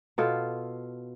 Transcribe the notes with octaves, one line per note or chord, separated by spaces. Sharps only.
B2 F4 A4